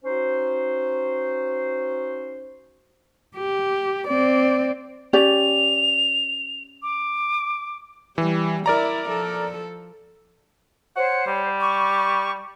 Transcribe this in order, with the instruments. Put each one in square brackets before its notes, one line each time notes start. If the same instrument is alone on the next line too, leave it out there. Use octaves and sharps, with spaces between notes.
[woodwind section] C#4 D#4 F#4 C5
[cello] G4
C4 D5
[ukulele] C#4 G4 D5 [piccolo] F7
[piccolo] D6
[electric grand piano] E3 [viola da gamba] G3
[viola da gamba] E4 [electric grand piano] A#4 D5 A#5
[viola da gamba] F3 A4
[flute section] C5 [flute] C#5 [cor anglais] F#5
[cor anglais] G3
[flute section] C#6 [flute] D6